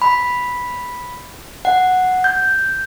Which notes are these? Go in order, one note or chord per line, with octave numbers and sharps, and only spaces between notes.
B5
F#5
G6